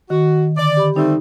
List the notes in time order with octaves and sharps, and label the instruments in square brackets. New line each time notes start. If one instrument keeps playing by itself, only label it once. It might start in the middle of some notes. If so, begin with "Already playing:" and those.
[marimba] D#3 [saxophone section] F#4
[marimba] D3 [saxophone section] D5
[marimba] G4 B5
[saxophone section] G3 A3 C4 [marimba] D#4